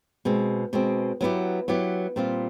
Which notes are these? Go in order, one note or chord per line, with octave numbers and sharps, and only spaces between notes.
B2 G#3 C4
B2 G#3 C4
F#3 B3 E4 G4
F#3 B3 E4 G4
A#2 G3 C4 F4